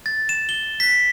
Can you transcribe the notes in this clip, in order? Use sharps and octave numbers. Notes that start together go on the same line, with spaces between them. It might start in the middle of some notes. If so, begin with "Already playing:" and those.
A6
E7
G7
B6